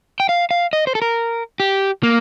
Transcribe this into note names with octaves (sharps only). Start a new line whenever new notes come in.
G5
F5
F5
D#5
C5
A4
A#4
G4
A#3